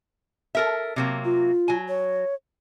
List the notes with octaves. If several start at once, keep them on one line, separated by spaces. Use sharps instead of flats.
A4 A#4 E5
C3 F#3 A#3
F4
F#3 G#5
C#5